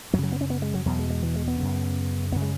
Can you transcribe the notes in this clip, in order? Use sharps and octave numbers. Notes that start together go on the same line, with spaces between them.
F#2 C#3 F#3
F#3
B3
C#4
B3
G#3
F#3
E2 B2 F#3
G#3
G#3
E3
G#3
B3
F#2 C#3
F#2 C#3 B3
G#3